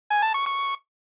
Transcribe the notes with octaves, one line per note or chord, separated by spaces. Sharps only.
G#5
A5
C#6
C#6